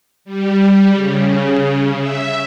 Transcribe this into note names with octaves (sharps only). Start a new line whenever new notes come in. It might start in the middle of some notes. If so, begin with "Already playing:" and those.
G3
C#3
E5